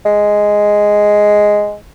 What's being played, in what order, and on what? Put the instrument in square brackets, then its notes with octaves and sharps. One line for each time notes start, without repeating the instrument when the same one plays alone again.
[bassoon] G#3